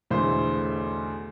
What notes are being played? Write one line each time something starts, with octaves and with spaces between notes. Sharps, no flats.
B1 E2 D3 A3 C5 C6